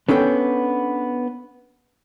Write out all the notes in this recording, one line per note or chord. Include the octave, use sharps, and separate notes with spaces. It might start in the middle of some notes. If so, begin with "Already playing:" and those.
B3 C#4 D4 A4 G5